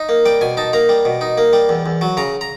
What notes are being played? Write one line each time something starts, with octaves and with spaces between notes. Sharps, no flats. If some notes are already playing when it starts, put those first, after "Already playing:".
Already playing: D#4
A#3
G3 G5
B2 G#5
D#4 A5
A#3 A#5
G3
B2
D#4
A#3
G3
E2
E2
F#3
C#3 A#5
A#5